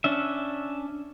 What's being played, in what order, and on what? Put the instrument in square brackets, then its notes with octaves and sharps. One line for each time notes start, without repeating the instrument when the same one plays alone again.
[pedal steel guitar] C#4 D4 E5